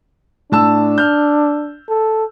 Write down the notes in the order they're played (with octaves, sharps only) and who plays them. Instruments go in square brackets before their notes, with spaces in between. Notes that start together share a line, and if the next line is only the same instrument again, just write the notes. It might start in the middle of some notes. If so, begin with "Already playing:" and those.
[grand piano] A2 A5 E6 [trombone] D4
[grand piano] F6 G6
[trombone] A4